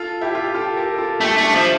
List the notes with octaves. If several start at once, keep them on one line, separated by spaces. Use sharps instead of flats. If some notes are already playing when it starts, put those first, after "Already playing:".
Already playing: F4 A4
E4 G4
F4
G4
F4 A4
G4 A#4
F4 A4
A3 E4 G4
A3
D4 F4
F3